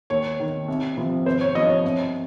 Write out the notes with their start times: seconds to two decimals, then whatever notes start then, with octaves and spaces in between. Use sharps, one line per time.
0.10 D#2 C#5
0.40 D#3
0.68 C2
0.97 C3 F3
1.26 G#1 C5
1.41 C#5
1.55 G2 F3 D#5
1.69 C#5
1.84 C2